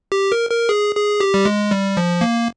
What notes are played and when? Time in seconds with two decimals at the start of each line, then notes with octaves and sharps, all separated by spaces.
0.12 G4
0.32 A#4
0.50 A#4
0.69 G#4
0.95 G#4
1.20 G4
1.34 G3
1.45 G#3
1.71 G3
1.97 F3
2.21 A#3